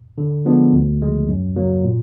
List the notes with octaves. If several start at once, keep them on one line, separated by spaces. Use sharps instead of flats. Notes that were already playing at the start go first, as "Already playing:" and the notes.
D3
F3 G#3 B3 D4
D2
C#3 F3 G#3
F#2
C#3 F#3 A#3
A#2